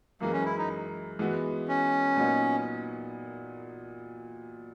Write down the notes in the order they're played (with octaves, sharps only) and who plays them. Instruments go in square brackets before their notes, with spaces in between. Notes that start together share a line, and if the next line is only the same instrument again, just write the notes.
[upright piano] F#2 E3 G#3 [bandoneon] A#3
[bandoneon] C#4
E4
D#4
[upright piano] E3 G#3 B3 F#4
[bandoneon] C#4
[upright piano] A#2 F#3 B3 D#4